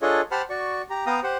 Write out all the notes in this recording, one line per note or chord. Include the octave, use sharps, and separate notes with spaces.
D4 F4 G#4 A4 C#5 D#5
G4 C5 F#5 A5 B5 F6
F#4 D5 C#6
G4 A#5
B3 F5 G5 A#5 D#6
G4 C5 F#5